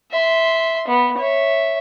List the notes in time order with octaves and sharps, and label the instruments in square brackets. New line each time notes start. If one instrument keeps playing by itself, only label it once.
[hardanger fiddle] E5 C6
B3
C#5 E5